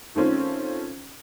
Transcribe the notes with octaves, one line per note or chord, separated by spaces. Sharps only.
D#3 A3 C4 C#4 F4